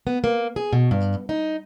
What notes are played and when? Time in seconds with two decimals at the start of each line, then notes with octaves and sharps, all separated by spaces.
0.07 B3
0.24 A#3
0.56 G#4
0.73 B2
0.91 G2
1.29 D#4